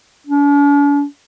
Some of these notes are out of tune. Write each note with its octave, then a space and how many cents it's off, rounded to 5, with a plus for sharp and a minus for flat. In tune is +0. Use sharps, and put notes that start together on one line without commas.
D4 -45